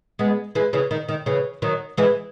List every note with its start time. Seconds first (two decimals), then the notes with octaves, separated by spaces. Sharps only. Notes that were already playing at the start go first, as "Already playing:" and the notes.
0.19 G#3 B3
0.55 E3 G#3
0.73 C#3 E3
0.91 D#3
1.08 D#3
1.26 C#3 E3
1.62 D#3 F#3
1.97 E3 G#3